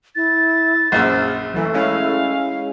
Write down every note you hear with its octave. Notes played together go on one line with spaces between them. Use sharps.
E4 A6
A#1 F#2 G#4 C5 F5 E6
E3 F#3 A3
G#3 C#4 E4 F5